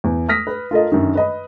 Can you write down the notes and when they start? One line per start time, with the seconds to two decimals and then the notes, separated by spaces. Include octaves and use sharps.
0.04 E2
0.29 D#6 F6 A#6 B6
0.47 B4
0.71 F4 A4 A#4 D#5
0.92 F#2 D3 D#3
1.15 B4 D#5 B5